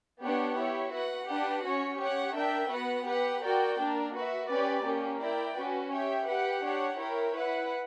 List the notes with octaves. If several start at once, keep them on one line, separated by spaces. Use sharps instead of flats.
B3 D4 G4 C#5 F#5
E4 G4 C#5
F#4 B4 F#5
D4 G4 B4 F#5
C#4 F#4 C#5
G4 C#5 F#5
D4 A#4 E5 G5
B3 F#4 B4 F#5
G4 B4 F#5
F#4 A#4 D5 G5
A#3 D4 A#4
F#4 B4 E5
C#4 G4 B4 D5
A#3 C#4 G4
E4 A#4 D5 G5
C#4 F#4 B4
G4 C#5 E5 G5
G4 B4 F#5
D4 G4 C#5 F#5
E4 A#4 C#5 G5
E4 B4 F#5